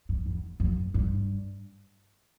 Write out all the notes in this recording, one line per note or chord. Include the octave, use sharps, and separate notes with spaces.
G2
E2
F#2
G2